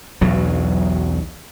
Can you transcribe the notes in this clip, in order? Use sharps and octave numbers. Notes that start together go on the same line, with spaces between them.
B1 E2 F#3